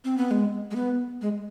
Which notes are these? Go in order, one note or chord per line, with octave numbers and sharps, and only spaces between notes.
C4
B3
G#3
G#3
B3
G#3